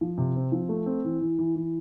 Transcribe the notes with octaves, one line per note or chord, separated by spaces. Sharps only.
F3
C3
C4
F3
A3
C4
E3
E3
E3
E3